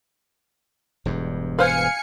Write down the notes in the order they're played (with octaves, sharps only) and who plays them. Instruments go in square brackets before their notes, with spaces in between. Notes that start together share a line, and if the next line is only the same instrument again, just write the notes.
[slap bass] E1 E2 G2
[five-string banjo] B4 C5 [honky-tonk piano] F5 F6 [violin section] G#5 C#7